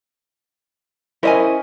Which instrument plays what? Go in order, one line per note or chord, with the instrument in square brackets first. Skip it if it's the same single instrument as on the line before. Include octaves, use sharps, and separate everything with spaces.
[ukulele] C#4 D#5 G#5 [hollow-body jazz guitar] E4 A#4 C5